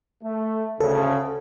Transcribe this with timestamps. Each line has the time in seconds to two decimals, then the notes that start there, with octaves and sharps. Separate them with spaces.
0.24 A3
0.80 D2 C#3 A4